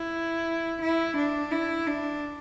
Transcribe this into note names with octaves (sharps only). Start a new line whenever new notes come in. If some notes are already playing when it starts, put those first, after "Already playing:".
Already playing: E4
E4
D4
E4
D4